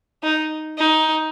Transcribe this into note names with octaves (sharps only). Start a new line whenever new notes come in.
D#4
D#4